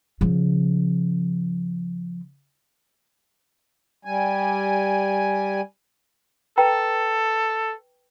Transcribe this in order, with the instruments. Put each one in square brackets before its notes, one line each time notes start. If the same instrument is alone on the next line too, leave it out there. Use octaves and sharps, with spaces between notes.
[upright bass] C#3 F3
[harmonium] G3 G#5
[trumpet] A4 [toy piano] B4 G5 A#5